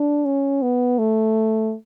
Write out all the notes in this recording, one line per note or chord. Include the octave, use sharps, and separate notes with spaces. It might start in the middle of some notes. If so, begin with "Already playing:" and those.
Already playing: D4
C#4
B3
A3